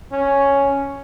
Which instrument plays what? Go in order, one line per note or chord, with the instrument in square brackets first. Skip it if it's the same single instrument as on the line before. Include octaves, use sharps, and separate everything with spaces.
[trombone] C#4